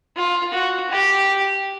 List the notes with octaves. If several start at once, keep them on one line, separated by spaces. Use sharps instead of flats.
F4
F#4
G4